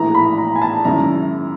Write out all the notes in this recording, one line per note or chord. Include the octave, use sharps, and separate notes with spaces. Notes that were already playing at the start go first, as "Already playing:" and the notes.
Already playing: A#1 A2 E3 A3 A#5
B5
A#5
G#5
A5
F#2 D#3 G#3 C#4 E4 A#5